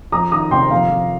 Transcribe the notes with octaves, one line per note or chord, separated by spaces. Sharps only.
F2 A#5 D#6
D#3 A#5 D#6
C3 G5 C6
F2 F5 A#5
F2